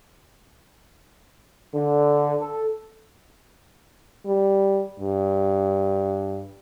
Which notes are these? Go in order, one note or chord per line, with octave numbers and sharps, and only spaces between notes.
D3
A4
G3
G2